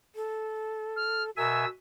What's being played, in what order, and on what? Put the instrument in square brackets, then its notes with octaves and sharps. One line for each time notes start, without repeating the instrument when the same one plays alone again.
[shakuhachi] A4
[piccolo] F6
[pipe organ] B2 E5 G#5 [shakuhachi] A#4 [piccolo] E6